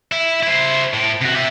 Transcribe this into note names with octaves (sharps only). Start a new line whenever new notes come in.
E4
E4 C5
A2
C3 F#4
G4 E5